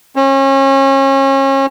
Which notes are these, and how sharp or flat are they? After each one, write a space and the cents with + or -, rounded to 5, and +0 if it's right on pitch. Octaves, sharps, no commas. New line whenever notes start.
C#4 -35